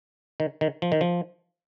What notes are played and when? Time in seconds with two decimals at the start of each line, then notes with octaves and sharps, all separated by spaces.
0.40 D#3
0.61 D#3
0.82 F3
0.92 D#3
1.01 F3